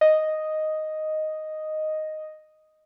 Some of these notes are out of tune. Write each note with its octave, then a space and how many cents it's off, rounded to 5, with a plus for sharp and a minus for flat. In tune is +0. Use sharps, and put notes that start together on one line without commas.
D#5 +0